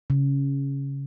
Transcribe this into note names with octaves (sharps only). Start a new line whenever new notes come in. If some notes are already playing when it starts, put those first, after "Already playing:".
C#3